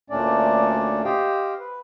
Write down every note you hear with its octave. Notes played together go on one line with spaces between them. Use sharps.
D2 A#2 A3 C#4 D4 D5
G4 C5 D#5 F5 G5
B4